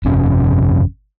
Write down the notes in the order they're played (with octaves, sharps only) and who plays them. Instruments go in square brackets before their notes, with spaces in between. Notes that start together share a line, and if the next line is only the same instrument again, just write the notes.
[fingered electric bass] G1 F2 C3 C#4